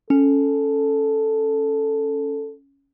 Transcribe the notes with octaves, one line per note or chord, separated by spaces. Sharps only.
C#4 A4